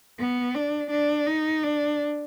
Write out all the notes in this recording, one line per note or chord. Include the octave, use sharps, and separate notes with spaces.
B3
D4
D4
D#4
D4